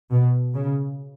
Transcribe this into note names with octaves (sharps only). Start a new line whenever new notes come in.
B2
C#3